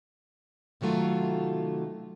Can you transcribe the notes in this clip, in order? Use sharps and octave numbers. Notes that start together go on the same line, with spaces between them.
C3 D#3 F#3 A3 F4